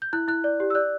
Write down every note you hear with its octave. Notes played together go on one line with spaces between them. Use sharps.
G6
E4 F#6
E4 F#6
D5
G4
E6
D5 F#6